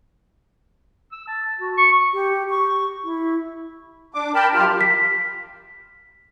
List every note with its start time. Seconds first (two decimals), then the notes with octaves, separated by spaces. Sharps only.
1.12 E6
1.28 A5
1.59 F#4
1.77 C#6
2.14 G4
2.50 C#6
3.04 E4
4.14 D4 D6
4.35 A#4 G5 A5 B5
4.54 F#2 F4 G4 F6
4.81 B6